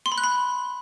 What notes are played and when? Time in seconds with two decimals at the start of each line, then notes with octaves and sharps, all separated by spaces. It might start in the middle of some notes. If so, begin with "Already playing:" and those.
0.06 C6
0.12 B5
0.18 F#6
0.24 B5